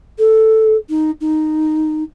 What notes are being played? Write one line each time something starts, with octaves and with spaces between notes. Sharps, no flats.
A4
D#4
D#4